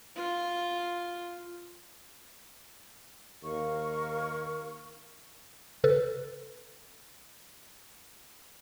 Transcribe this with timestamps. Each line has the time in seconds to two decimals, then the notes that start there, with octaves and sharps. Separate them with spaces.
0.16 F4
3.43 D#2 A#4 F5 C#6
5.84 C#3 A4 B4